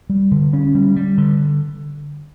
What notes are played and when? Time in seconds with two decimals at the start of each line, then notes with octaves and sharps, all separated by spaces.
0.10 G3
0.31 D3
0.53 C#4
0.75 G3
0.96 G3
1.18 D3